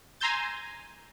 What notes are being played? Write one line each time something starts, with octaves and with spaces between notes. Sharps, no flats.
G#5 A#5 C6 E6 G6 A6